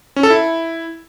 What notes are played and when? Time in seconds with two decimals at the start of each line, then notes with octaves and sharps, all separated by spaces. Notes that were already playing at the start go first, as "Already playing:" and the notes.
0.16 C#4
0.23 A4
0.30 E4